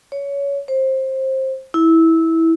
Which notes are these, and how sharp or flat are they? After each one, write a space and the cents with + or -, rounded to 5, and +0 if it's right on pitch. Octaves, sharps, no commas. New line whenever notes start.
C#5 +20
C5 +20
E4 -15